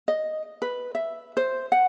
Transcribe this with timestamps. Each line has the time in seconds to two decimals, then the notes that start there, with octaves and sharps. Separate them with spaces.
0.08 D#5
0.62 B4
0.95 E5
1.37 C5
1.72 F#5